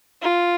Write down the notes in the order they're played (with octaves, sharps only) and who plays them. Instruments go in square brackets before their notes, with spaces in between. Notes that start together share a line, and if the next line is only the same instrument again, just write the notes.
[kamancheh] F4